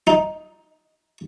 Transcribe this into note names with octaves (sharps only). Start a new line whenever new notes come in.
D#4